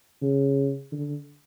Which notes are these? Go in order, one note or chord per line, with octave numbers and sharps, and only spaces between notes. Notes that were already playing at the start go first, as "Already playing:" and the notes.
C#3
D3